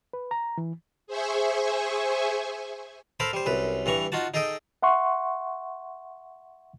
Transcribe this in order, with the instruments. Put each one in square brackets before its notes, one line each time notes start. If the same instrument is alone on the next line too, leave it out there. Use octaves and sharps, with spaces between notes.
[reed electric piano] B4
A#5
E3
[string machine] G#4 C5 E5 G#5 C#6
[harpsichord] A4 A#4 C5 F5 A5 B5
G3 C5
C2 F#2 B4
G2 E3 A#5 C#6
D#4 F4 F#4 F#5 A5
D#4 G#4 A4 D#5 G5 D#6
[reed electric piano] E5 F#5 C6 C#6